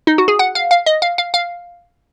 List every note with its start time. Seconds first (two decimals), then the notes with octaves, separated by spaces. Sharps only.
0.07 D#4
0.18 F#4
0.28 G#4
0.39 F#5
0.55 F5
0.71 F5
0.86 D#5
1.02 F5
1.18 F5
1.34 F5